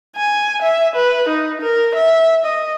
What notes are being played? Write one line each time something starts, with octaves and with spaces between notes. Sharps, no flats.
G#5
E5
B4
D#4
A#4
E5
D#5